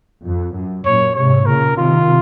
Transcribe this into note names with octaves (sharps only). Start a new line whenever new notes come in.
F2
F#2
F#2 A#2 C#5
G#2 C3 C#5
A#2 C#3 A#4
C3 D#3 F4